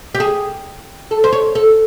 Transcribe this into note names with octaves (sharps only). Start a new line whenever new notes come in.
G4
G#4
A4
C5
C#5
A4